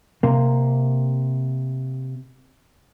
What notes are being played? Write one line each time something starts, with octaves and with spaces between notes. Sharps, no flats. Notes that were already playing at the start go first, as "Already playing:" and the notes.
C3 A#3